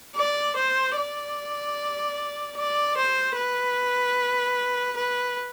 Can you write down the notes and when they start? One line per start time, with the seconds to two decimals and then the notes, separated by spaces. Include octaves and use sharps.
0.16 D5
0.56 C5
0.96 D5
2.57 D5
2.97 C5
3.36 B4
4.96 B4